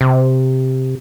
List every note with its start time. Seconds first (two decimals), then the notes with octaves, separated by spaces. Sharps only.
0.01 C3